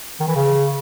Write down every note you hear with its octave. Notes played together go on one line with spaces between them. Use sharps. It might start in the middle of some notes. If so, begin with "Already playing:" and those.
D#3
E3
C#3